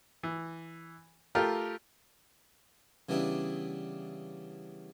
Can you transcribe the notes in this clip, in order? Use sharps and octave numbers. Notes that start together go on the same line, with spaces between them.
E3
A3 F4 G4 A#4
C#3 E3 G3 B3 D4 E4